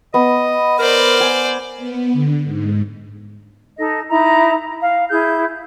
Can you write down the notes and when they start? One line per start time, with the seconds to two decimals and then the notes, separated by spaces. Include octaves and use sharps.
0.14 B3 D#5
0.79 A#4 C5 D5
1.20 G#5
1.78 B3
2.13 D3
2.45 G#2
3.78 D#4 A4 D#5
4.09 D#4 E4 A#5
4.83 F5
5.10 E4 G#4 G6